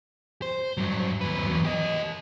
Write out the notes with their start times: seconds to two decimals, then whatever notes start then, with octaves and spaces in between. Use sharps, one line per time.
0.42 C5
0.77 G2 F#3
1.21 D#2 B4
1.46 E2 F#3
1.65 G4 D#5